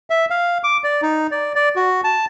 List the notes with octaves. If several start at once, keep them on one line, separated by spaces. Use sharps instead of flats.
E5
F5
D6
D5
D#4
D5
D5
F#4
A5